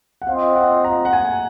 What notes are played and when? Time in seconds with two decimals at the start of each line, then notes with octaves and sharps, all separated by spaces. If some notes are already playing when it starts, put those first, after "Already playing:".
0.22 F#5
0.27 C4 F4 C5 D#5 F5
0.55 F#5
0.84 A#5
1.05 F#5
1.13 G#5